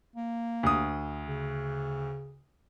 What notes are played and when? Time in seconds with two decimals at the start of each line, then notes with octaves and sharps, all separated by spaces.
0.16 A#3
0.63 D2 D#6
1.27 C#3